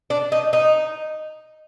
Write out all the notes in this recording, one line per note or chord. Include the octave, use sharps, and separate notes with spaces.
D4
D#4
D#4